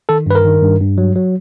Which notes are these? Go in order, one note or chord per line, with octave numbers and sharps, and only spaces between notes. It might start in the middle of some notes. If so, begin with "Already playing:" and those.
D#3 A4
G2 B4
A#4
D#3
G2
G2
F#3
F#3